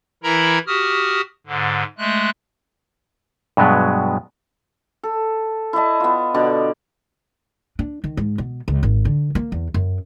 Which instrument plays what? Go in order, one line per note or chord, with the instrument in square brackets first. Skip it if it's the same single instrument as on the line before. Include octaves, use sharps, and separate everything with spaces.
[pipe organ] E3 E4 A#4 A#5 B5
F#4 G4 D#6 F6
G#2 D3
G#3 A3 F#6
[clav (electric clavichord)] G2 B2 F#3 G#3 B3
[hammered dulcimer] A4
E4 D5 D#5 A5
B3 F4
B2 D3 D5
[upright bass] D4
D#3
G#2
B2
C#2
G#1
D3
A#3
E2
F#2